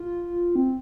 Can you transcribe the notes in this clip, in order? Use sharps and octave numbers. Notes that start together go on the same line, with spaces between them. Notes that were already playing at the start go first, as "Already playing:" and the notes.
Already playing: F4
C4